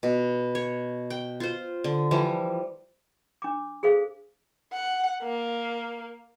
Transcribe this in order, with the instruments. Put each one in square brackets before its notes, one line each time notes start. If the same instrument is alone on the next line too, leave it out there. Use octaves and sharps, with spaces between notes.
[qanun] B2
C#5
G5
F4 C5
D3
E3 F3 G3
[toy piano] D4 D6
G#4 A4 C5 F5
[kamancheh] F#5
A#3